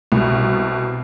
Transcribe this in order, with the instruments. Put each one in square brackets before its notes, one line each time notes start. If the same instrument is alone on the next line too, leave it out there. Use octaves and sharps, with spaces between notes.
[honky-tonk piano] C2 B2